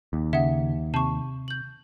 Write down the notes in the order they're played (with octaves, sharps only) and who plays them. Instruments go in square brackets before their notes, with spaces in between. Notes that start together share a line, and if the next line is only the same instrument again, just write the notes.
[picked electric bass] D#2
[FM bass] C#3 [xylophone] E5 F#5
[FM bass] C3 [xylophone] A5 C#6
[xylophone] G6 F#7